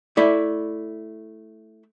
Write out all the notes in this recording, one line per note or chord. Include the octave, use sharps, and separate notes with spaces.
A3 E4 D5